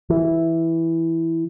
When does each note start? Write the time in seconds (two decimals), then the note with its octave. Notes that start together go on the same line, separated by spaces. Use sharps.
0.10 E3